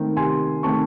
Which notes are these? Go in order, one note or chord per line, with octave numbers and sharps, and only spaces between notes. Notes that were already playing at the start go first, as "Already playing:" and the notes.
Already playing: D#3 A3 C4
C3 G#5 C6
D#3 A3 C4 A5 C#6